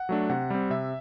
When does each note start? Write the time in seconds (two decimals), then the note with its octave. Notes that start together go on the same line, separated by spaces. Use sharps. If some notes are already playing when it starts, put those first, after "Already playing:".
Already playing: F#5
0.09 F#3 A3 D4
0.30 C3 F#5
0.50 G3 C4
0.70 C3 E5